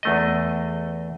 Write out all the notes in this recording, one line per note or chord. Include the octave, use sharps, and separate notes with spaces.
E2 A3 D#5